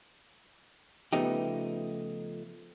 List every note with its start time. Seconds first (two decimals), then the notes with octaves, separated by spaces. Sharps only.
1.13 C#3 F3 A3 B3 D#4 G4